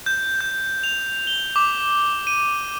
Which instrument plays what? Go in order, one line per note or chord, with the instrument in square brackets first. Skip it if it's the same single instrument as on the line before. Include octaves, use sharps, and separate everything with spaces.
[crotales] G6
G6
F7
G7
D6
D#7